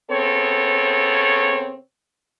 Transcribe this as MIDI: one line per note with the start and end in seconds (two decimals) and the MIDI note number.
0.10 1.77 49
0.10 1.77 59
0.10 1.77 60
0.10 1.77 69
0.10 1.77 73